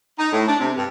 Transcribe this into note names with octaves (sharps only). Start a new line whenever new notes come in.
D#4
A2
D4
C3
G2